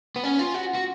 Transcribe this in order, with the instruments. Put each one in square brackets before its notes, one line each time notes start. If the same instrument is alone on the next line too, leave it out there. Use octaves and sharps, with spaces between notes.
[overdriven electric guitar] B3
C#4
F4
F#4
F#4